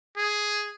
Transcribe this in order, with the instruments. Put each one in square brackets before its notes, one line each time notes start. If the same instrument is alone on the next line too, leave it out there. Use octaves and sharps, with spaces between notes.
[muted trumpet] G#4